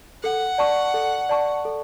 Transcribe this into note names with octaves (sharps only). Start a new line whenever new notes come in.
A4 F#5
D5 A5 C#6
A4
D5 A5 C#6
A4